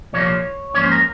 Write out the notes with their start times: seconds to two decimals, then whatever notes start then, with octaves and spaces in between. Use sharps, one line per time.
0.13 C2 A#2 F3 A#3 C#5
0.74 G#2 F3 A#3 C#4 C#5
0.84 C5
0.92 A#4